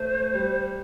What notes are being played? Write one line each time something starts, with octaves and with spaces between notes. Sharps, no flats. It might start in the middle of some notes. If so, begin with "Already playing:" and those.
Already playing: A3 C5
G3